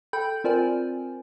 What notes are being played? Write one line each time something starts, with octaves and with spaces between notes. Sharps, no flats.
A4 G5 B5 G6
C4 F4 A#4 C5 D5 G#5